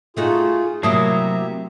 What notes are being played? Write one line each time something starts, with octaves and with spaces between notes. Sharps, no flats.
A3 D#4 F4 F#4 G#4
C3 F#3 A3 A#3 E4 G4 E5 D#6